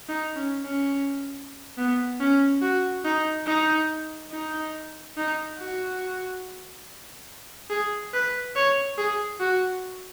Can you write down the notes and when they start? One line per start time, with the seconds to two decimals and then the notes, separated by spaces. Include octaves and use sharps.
0.09 D#4
0.36 C#4
0.64 C#4
1.78 B3
2.20 C#4
2.62 F#4
3.05 D#4
3.47 D#4
4.32 D#4
5.17 D#4
5.58 F#4
7.70 G#4
8.13 B4
8.56 C#5
8.98 G#4
9.40 F#4